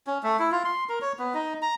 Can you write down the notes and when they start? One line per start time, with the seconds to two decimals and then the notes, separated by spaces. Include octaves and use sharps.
0.07 C#4
0.23 A3
0.39 E4
0.52 F4
0.65 C6
0.89 A#4
1.02 C#5
1.19 B3
1.34 D#4
1.62 A#5